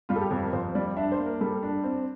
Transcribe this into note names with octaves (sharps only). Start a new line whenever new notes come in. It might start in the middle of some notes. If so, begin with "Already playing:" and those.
G3 F4
A4
G4
F2
A#4
F2 C5
G3 D5
D4 E5
C5
A#3
A#4
G3 A4
D4
C4